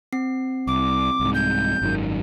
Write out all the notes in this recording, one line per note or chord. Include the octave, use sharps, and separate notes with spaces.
C4 C7
C2 D6
C2 G#2
G6
G#1 F#2 D#3